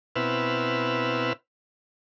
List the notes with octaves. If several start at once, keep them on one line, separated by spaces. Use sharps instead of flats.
B2 C4 E4 B4 E6 F6